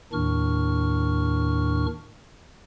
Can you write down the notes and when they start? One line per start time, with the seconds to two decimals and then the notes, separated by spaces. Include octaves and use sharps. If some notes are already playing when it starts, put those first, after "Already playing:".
0.13 D#2 A2 D#3 D4 C#6 F6